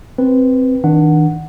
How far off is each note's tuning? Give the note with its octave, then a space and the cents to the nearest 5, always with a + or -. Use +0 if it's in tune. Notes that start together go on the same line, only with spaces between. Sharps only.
C4 +0 B4 +0
D#3 +40 D4 +25 F#5 +0